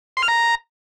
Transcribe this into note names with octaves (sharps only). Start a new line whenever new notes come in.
C6
F6
A#5